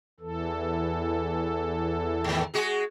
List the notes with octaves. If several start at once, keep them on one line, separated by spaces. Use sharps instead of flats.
E2 E3 A4
G#2 D#3
G#3 F#4 G#4